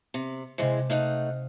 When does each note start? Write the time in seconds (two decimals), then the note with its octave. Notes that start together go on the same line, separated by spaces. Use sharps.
0.14 C3 C#7
0.58 C3 E3 G#3 C5
0.90 A3 D#4 F5 F#5